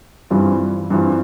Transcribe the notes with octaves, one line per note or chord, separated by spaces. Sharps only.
G2 E3 G3 C4 F4
G2 E3 G3 C4 F4